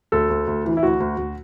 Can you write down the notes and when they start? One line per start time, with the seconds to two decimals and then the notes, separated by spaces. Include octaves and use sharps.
0.12 D2 A4
0.30 D2
0.47 D2
0.65 E3
0.77 E4
0.83 D2 F#4
1.00 D2
1.18 D2